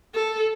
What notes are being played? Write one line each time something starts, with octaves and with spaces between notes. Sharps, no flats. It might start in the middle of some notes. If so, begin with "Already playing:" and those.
A4